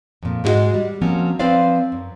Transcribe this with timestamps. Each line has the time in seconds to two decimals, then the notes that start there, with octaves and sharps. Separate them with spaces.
0.23 F2 A#2
0.44 G#2 G#3 E4 F#4 G#4 D#5
0.74 G3
1.02 F3 F#3 A#3 C4 C#4
1.39 F3 C4 B4 C5 D5 F5
1.92 F#2